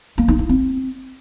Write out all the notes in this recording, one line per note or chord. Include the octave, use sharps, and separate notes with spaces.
A#3
D#4
E4
C4